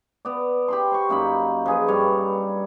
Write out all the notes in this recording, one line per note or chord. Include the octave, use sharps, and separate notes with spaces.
B3 D5
G4 B5 C6
C5 C#6
F#2 A#3 D#4 B5
F3 G#4 B4
G2 G3 C#5